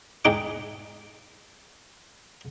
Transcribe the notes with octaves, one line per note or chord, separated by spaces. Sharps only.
G#2 G#3 D#4 G5 D6